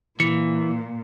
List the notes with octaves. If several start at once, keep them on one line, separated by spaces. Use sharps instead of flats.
A#2 E3 C#7